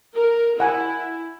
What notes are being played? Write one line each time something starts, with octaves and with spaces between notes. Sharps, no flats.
A#4
E4 F#5 G#5